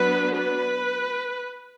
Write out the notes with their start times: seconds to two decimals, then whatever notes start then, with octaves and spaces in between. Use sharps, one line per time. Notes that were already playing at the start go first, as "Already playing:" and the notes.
Already playing: F#3 B3 D4 B4
0.34 B4